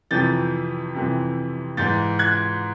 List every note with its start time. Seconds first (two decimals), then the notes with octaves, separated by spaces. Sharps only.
0.11 F2 C3 E3 G6 A6
0.94 F2 C3 E3
1.77 G#2 E3 G6 A6
2.19 F#6 G#6